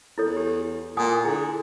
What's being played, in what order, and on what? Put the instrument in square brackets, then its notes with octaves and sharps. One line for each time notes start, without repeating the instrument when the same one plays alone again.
[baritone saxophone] E2 [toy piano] E4 A4 C#5
[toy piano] G4
[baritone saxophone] A#2 [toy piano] F#5 G#5 D#6
[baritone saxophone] D3 [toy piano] E4 G#4